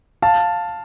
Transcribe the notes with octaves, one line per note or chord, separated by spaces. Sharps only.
F5 A5